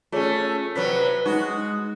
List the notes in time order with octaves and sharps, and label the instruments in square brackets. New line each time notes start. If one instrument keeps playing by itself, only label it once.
[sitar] A3 C#4 [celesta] F4 G#4 C#5
[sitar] C3 F#3 [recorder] B4 [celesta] B6
[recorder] G#3 [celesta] D#4 [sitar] F#4